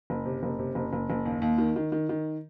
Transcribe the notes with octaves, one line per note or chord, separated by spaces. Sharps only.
F#1
C3
F#1
C3
F#1
F#1
F#1
D#2
D#2
D#3
D#3
D#3
D#3